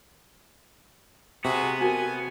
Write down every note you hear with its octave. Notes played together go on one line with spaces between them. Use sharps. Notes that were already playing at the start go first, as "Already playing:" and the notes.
C3 B3 F#4 G#4
F#4 A4 A#4 G#5